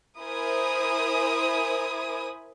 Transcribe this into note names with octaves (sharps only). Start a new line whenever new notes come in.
E4 A#4 C5 G#5 B5 D#6